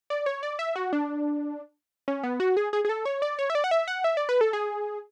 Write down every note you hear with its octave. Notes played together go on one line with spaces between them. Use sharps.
D5
C#5
D5
E5
F#4
D4
C#4
B3
F#4
G#4
G#4
G#4
A4
C#5
D5
C#5
E5
D5
F#5
E5
F#5
E5
D5
B4
A4
G#4